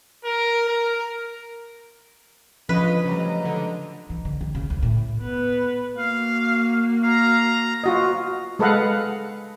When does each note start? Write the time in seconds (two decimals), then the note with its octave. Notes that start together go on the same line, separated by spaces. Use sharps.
0.25 A#4
0.69 A#4
2.69 C#2 D3 F3 C#4 F4 B4 D#5
3.05 A1 C#3 F#3 G3 D#5 A#5
3.45 D3 G#3
4.10 E3
4.25 D3
4.41 D#3
4.55 C#3
4.70 D2
4.82 A2
5.20 B3 B4
5.98 A#3 F#4 F5
7.03 F5 A#5
7.84 F4 F#4 D#5
8.59 G#3 A4 B4 D#5 F5 F#5